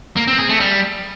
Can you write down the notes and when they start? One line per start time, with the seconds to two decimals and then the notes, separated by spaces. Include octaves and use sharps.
0.17 A#3
0.27 C4
0.38 G#4
0.49 A3
0.60 G3